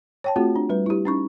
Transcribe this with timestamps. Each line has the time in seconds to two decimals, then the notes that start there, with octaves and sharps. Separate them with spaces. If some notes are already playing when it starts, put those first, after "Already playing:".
0.24 C#5 G5 A5
0.36 A3 C4 F4 F#4 G#4
0.56 D4
0.70 G3 B4
0.86 E4 G4
1.05 C#4 D#4 C#6